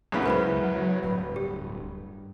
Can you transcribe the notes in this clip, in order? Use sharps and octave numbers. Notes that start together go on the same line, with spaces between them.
C#2 F#2 C#3 B3 D4 E4
G#3 E4 B4 C5 F#5 B5
F#3
D1 G2
G4